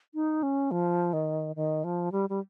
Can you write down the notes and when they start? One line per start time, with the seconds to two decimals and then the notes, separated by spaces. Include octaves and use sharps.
0.14 D#4
0.43 C#4
0.71 F3
1.13 D#3
1.56 D#3
1.84 F3
2.12 G3
2.29 G3